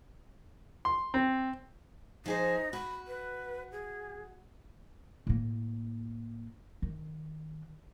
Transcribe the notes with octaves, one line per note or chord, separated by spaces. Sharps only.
C6
C4
F3 D#4 G#4 C5
F#4 B5
B4
G#4
A2 A#3
D#3